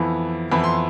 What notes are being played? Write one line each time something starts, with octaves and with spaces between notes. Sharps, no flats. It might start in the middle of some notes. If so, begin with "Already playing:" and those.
Already playing: F2 E3 B3 E4
F2 E3 B3 E4 B5
C6